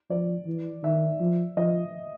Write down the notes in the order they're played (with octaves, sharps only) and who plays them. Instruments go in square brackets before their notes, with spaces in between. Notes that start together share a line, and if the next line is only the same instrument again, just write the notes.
[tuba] F3 [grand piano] D5
[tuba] E3
[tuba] D#3 [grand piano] E5
[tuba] F3
[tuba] F3 [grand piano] D#5